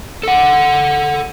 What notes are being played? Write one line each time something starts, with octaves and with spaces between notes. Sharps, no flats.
A4 F#5